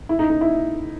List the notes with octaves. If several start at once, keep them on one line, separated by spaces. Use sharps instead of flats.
E4
D#4
D#4
E4